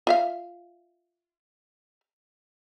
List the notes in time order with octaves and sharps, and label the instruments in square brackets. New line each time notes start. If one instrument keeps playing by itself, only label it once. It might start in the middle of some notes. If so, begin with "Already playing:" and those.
[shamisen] F4 E5 F5